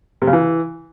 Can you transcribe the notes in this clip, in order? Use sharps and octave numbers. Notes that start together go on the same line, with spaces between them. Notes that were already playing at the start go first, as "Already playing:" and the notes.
C3
C#3
E3